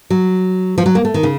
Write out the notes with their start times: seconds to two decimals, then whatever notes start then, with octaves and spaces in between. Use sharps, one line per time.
0.10 F#3
0.78 F3
0.86 F#3
0.95 A#3
1.05 A3
1.14 D#3
1.23 C#3